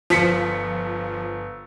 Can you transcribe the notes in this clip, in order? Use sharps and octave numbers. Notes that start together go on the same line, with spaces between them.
G1 F3 B6 C#7